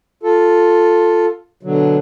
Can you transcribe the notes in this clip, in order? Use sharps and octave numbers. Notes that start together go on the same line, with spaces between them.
F4 A4
B2 D3 F#3